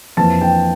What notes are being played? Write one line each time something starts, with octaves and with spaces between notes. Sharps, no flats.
F2 E3 A#3 A5
G5